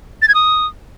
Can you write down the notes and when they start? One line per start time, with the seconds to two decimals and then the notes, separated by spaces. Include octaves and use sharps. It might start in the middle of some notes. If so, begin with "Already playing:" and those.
0.22 A6
0.28 G#6
0.34 D#6